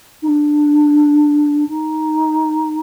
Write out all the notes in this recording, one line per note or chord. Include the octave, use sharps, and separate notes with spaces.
D#4
D4
D#4